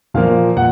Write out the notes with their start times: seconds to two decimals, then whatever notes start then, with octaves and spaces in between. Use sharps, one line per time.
0.14 A#2 F3 A#3 F5
0.57 A#2 F#5